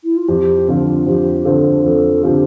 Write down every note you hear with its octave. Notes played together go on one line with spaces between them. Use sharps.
E4
F4
F2 G4
D3 F3 C4 F4
F2 G4
D3 F3 C4 F4 A4
F2 A4
D3 F3 C4 F4 G4